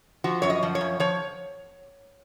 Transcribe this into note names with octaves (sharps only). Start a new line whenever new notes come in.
F3 F#4
F#2 C#5
D#5
F3
C#5
F#2
F3 C#5